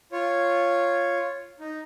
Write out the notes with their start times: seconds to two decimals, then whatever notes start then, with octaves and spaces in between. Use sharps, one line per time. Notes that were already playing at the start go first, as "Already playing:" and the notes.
0.12 F4 C#5
1.60 D#4